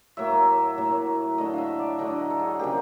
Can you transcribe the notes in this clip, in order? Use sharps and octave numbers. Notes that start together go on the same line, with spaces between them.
A2 F#3 A#3 E5
A2 F#3 A#3
D3 F#3 A3 D#5
E5 F5
D5
D3 F#3 A3 D#5
A4
G#4
C#3 F3 A#3 G4